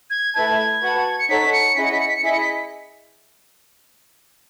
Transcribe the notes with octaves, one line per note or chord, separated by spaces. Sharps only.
G#6
A3 E4 B4 E5 A5 G#6
F#4 B4 F#5 A5
C#7
D#4 A4 C#5 F#5 A5 B6
C#7
C#4 E4 G#4 D#5 F#5 B6
C#7
B6
C#7
B6
C#7
E4 G#4 D#5 B6
C#7
B6